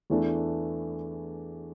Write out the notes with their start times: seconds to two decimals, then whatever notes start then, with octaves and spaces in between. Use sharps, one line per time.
0.10 E2 E3 A3 D4